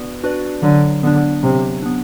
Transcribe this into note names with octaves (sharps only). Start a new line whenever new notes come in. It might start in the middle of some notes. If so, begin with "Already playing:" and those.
Already playing: B3 D4 F#4 B4 D5
D4 F#4 B4 D5
D3 F#3
D3 B3 D4
C3 F#3
B3 D4